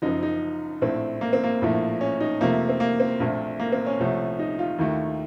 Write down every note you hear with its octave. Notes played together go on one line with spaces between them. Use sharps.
F#1 F#2 F3 D#4
D#4
A#1 A2 A3 C4
A#3
C4
A#3
A#1 A2 F3 A3
C#4
D#4
F2 C3 F3 A3 A#3
C4
A#3
C4
A#1 A#2 A3
A#3
C4
C#4
C2 C3 F3 A3
D#4
F4
D#2 D#3 A3